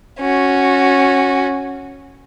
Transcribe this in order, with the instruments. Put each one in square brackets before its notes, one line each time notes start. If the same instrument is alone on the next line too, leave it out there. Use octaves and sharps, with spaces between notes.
[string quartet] C#4 F#4